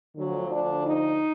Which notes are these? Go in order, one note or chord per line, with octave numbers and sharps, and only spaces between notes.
D2 D3 F3 F#3
D4
D#4